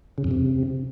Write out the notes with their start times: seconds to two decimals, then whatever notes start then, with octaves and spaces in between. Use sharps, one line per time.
0.18 C#3
0.24 F2
0.31 C3